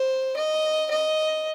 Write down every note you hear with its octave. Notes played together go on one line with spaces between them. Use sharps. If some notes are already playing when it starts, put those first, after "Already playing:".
Already playing: C5
D#5
D#5